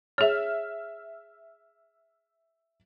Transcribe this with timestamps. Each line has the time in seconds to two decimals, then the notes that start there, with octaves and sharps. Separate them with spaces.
0.18 G#4 C#5 E5 F6